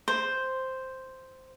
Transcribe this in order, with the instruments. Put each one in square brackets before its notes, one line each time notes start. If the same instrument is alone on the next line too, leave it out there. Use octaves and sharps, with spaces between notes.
[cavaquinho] C5